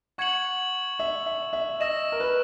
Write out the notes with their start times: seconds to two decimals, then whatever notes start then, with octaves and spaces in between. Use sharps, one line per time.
0.18 F#5 C#6 G#6 C#7 F#7
0.99 E5
1.26 E5
1.53 E5
1.80 D#5 E6 A#6 E7
2.12 A#4
2.20 B4